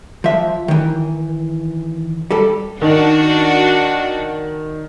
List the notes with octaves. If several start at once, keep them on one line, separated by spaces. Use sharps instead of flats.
F3 E5
D#3 E3
G3 A4
D#3 D4 F#4